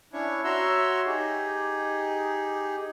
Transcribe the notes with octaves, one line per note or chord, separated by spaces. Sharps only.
C#4 D4 E4 C#5
F#4 C#5 E5 A#5 C6 E6
D#4 G4 G#4